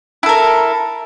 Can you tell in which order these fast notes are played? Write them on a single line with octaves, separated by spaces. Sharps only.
E4 A4 A#4